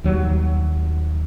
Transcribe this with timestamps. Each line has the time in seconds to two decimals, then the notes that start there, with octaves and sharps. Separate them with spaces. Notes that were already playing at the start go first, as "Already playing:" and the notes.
0.04 D#2 F#3 G3